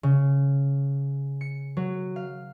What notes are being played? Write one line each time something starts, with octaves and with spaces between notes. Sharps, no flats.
C#3
C#7
F#3
F5